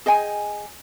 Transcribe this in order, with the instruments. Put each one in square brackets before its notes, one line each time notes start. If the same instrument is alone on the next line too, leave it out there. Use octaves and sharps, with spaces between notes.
[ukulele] G#4 D#5 G5 G#5